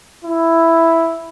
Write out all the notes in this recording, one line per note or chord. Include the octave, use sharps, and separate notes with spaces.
E4